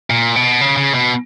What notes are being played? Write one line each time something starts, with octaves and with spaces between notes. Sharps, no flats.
A#2
B2
C#3
C#3
B2